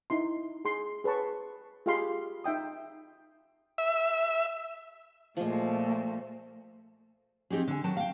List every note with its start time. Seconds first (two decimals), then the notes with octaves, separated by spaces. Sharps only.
0.10 D#4 E4 C6
0.65 G#4 C6
1.04 G#4 B4 C#5 A5 C#6
1.86 F4 G4 G#4 F5 B5 C6
2.44 D#4 E5 G5 D#6
3.78 E5
5.37 A#2 F3 G#3 A3
7.50 F2 D#4 G4 G#4
7.67 D3 G#5
7.84 D#3 F#3 A5
7.97 F5 G5